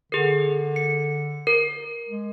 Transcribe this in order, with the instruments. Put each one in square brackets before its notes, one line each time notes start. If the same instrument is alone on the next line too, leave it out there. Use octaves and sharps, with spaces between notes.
[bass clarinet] D3 [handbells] G#4 A#4
[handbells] C#7
A#4
[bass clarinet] G#3